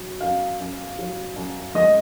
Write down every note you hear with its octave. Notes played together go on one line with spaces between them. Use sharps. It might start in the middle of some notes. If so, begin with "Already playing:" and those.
Already playing: F#3
F#2 F5
F#2
F#3
F#2
G#3 D#5